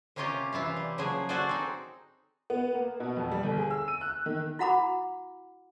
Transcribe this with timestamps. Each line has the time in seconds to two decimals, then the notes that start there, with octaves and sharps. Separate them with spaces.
0.16 C3 A#3 C#4 F4 G4 D#5
0.53 E3 E4 F4 F5
0.76 G3
0.98 C#3 F3 F#3 A#3 G#4
1.29 F#4 G#4 A4 C5 D5 G#5
1.49 C4 D#4
2.50 B3
2.75 A#3
3.00 B2
3.17 F2
3.32 G3
3.43 G1
3.57 G#4
3.71 E6
3.88 D#7
4.01 F#6
4.26 D#3
4.59 E4 F#4 F#5 A#5 B5 D6